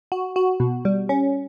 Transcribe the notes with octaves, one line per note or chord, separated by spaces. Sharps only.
F#4
F#4
B2
G3
C#4